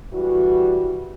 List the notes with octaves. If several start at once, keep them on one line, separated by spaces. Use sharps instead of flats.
D2 E3 G3 F#4